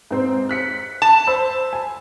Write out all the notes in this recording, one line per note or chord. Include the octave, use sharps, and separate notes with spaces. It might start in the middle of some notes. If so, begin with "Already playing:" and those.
G#2 C4 C5
F#6 B6 C#7
A5
C5 B5 E6
G#5